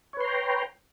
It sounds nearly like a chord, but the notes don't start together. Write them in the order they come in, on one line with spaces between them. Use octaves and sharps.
C#5 B4 C6 A#5 G5